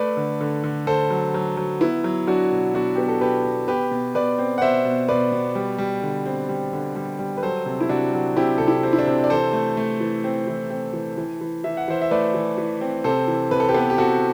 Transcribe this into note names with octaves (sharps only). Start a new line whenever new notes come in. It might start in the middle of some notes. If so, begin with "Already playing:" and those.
Already playing: A3 B4 D5
D3
D3
D3
D3 A4 C5
F#3
F#3
F#3
B3 E4
F#3
F#3 D4 F#4
B2
B2 D4 F#4
B3 G4
A4
B2 G4 B4
B2
B2 G4 B4
B2
B2 B4 D5
C4
F#5
B2 C5 E5
B2
B2 B4 D5
B2
G3
G3
D3
C4
G3
D3
G3
G3
B4
F#3 A4 C5
C3
E4
C3 D4 F#4
F#3
C3 E4 G4
C3 A4
E4 G4
C4
E4
D4
C3
D5
E3 A4 C5
A3
A3
E3
C4
E3
C4
E3
E3
E3
E3 E5
F#5
E3 C5 E5
E5
A3 B4 D5
E3
E3
C4
C3 A4 C5
E3
C3 B4
A4
G4 B4
B3
G4
C3 F#4 A4